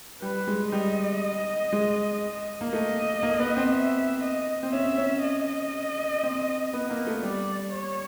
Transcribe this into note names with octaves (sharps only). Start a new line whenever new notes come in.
G3 B4
G#3
G3 D#5
G#3
A#3
A3 D#5
A#3
B3
C4
E5
D#5
C4
C#4 E5
C#4
D#5
C4
B3
A#3
A3
G3 D5
C#5